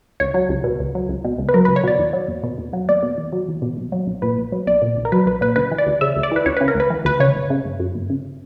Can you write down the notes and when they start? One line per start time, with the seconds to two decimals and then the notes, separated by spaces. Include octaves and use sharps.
0.20 C#2 C#5
0.34 F#3
0.49 C#2
0.64 B2
0.80 C#2
0.95 F#3
1.09 C#2
1.24 B2
1.38 C#2
1.49 B4
1.54 F#3 A#4
1.65 C#2 B4
1.76 C#5
1.83 B2 D5
1.99 E2
2.13 F#3
2.28 E2
2.43 B2
2.58 E2
2.73 F#3
2.89 E2 D5
3.02 B2
3.18 E2
3.32 F#3
3.48 E2
3.62 B2
3.77 B1
3.92 F#3
4.07 B1
4.22 A#2 B4
4.38 B1
4.52 F#3
4.67 B1 D5
4.82 A#2
4.97 B1
5.05 A#4
5.12 F#3 B4
5.26 B1 B4
5.41 A#2 B4
5.56 D2 B4
5.71 E3
5.78 D5
5.87 D2
6.01 C#3 E5
6.16 D2
6.23 D5
6.31 E3 B4
6.46 D2 C#5
6.57 C#3 B4
6.68 A#4
6.75 D2 B4
6.90 E3
7.05 D2 B4
7.20 C#3 C#5
7.35 G1
7.50 C#3
7.65 G1
7.79 F#2
7.95 G1
8.10 C#3